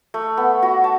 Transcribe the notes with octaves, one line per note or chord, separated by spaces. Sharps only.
A3
B3
F#4
A5